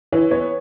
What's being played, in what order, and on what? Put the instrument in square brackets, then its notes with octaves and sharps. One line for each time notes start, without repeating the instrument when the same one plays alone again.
[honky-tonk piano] E3 [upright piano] C#5
[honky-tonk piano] B3 [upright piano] C#5